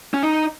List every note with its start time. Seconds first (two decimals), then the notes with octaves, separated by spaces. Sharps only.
0.14 C#4
0.23 D#4